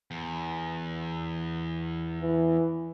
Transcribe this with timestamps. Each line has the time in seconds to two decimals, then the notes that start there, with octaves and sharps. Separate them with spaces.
0.11 E2
2.22 E3